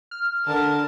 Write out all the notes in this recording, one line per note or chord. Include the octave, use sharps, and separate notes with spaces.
F6
D3 A#4 A5